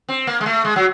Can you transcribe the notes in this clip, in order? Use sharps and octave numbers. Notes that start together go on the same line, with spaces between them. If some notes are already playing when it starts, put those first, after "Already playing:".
C4
A#3
G#3
A3
G#3
F#3